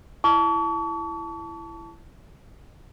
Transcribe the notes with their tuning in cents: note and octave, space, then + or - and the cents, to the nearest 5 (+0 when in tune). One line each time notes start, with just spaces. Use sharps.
E4 +20 A5 +0 C#6 +40